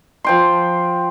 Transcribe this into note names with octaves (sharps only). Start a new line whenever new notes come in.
F3 G5 C6